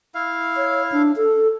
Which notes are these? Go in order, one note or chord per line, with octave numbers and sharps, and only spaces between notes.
E4 F5
C#5
D4
A4